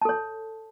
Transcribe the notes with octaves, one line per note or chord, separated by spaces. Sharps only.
A4 C#5 A5